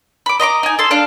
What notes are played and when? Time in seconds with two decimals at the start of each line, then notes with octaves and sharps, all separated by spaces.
0.26 B5 D6
0.40 D#5 A#5 C6 D6
0.63 D#4 G#5
0.79 A4 C6
0.91 D4 F5